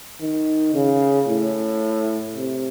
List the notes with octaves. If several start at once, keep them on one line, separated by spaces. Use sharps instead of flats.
D#3
C#3
A2
C3